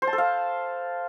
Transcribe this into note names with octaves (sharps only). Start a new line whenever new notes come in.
C5
A5
A4
F5